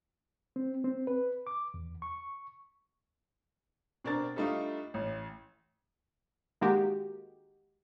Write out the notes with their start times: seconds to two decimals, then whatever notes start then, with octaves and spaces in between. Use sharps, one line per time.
0.56 C4
0.84 C4
1.07 B4
1.47 D6
1.74 E2
2.02 C#6
4.04 B2 C4 D4 A#4 D5 A6
4.36 G3 A3 D4 D#4 F4
4.94 A1
6.61 D#3 G#3 A#3 F#4 G4